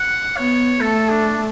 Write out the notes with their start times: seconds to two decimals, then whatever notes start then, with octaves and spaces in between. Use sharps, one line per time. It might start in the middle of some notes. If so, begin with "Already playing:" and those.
Already playing: F#5
0.37 B3 C#5
0.81 A3 A4
1.10 D4